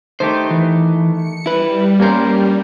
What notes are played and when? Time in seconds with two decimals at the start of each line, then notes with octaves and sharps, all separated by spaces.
0.20 D#3 A3 G4 C5
0.51 E3
1.12 C#7
1.46 G3 E4 B4
2.00 G2 A#3 C#4 A#4 C5